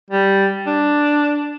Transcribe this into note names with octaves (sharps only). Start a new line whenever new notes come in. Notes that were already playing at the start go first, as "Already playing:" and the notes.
G3
D4